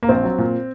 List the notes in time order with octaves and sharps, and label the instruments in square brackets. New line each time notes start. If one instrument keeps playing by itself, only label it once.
[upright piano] A#3
A#1 C4
F#3
A#2